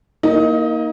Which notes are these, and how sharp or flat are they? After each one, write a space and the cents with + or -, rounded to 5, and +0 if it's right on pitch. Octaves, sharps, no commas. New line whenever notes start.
A#3 +5 D#4 +30 D#5 +0